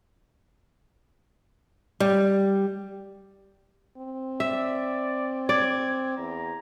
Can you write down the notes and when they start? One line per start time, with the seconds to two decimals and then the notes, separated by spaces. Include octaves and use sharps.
2.00 G3
3.98 C4
4.40 D5 E5
5.49 D5 G#6
6.18 E2 A#5